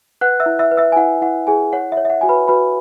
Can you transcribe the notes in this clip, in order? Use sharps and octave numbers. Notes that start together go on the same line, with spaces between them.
B4 F#5 F#6
E5 E6
E4
E5 E6
B4
E5 E6
G#5
E4 F#5
E4 F#5
E4 G#4 G#5
C#5 F#5
E5
C#5
E5
F#5
F#4 G#5
B4 B5
F#4 B4 B5